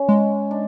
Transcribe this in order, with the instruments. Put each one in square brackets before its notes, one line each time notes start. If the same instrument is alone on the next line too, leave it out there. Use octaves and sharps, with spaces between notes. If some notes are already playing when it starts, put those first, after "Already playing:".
Already playing: [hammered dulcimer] C#4
[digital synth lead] G#3
[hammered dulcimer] D4